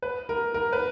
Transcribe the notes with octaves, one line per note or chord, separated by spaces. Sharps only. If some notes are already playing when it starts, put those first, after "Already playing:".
B4
A#4
A#4
B4